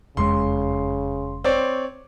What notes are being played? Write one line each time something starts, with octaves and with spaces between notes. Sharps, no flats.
F#1 F2 C#3 G#3 C6
C4 C#5 D5